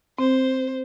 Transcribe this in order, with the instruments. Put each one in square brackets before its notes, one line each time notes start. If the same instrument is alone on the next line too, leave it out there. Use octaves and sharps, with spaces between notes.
[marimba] C4 [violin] C5